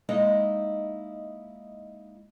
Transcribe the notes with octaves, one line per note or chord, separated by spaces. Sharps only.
G#3 A#3 D#4 E4 D#5